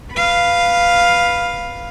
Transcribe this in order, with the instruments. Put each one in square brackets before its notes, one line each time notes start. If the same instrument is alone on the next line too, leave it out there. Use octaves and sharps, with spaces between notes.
[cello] B4 F5